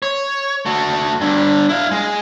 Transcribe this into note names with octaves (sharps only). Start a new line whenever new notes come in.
C#5
A3 F#4
G2 D3
E4 F5
G#3